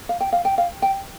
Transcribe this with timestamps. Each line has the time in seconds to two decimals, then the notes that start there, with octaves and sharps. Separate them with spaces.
0.09 F5
0.21 G5
0.33 F5
0.45 G5
0.58 F5
0.82 G5